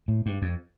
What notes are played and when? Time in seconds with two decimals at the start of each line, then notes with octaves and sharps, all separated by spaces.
0.08 A2
0.26 G2
0.42 F2